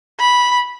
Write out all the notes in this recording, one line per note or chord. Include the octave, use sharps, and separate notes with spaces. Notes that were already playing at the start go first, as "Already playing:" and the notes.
B5